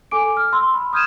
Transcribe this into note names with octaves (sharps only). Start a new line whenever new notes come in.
A4 G#5 D6 D7
F6
C6 E6
B5
D#6 F6 G6 G#6 D#7 E7